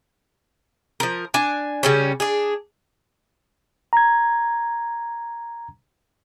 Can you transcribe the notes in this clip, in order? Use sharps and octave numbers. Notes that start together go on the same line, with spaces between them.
F3 A#4
D4 G#5
C#3 G3 C#4
D4 G#4
A#5 G#6